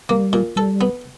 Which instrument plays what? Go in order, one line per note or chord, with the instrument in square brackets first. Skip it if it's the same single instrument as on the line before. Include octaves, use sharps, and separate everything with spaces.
[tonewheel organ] G3 [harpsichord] A#3
[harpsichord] A#2
[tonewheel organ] G3 [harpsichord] A4
[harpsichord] B3